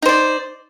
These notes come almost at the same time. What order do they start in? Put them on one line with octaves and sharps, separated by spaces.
D#4 C5 D5